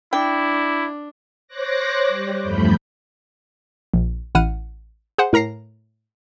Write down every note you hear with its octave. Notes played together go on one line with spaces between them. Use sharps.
D4 E4 G5
C5 C#5 D6 F#6 A#6
G3
E2 G2 F3 A3 B5 G6
A#1
A1 E4 F#5 F6 D#7
G#4 C5 F#5
A2 A#4 A#5 A#6 C7